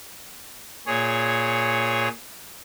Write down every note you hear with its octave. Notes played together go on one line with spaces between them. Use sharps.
A#2 G#4 C#5